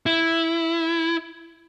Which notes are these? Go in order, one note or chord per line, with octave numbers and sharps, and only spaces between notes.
E4